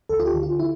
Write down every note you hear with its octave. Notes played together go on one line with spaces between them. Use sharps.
D2 A4
F4
G4
D3
F4
E4